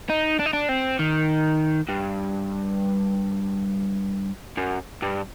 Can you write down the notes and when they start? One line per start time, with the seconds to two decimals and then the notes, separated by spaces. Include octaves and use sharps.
0.09 D#4
0.39 D4
0.46 D#4
0.53 D4
0.69 C4
0.99 D#3
1.88 G2
4.57 F#2
5.02 G2